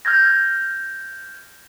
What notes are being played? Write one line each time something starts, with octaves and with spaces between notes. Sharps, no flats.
F6 G6 G#6 A#6